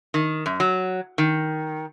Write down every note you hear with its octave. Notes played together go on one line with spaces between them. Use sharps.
D#3
F#2
F#3
D#3